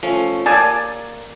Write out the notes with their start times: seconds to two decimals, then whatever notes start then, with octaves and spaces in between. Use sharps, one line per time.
0.03 F3 A3 C#4
0.46 A#3 D5 G#5 A5